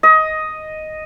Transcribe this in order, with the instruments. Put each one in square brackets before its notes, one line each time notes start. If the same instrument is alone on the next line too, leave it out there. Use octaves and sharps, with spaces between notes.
[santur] D#5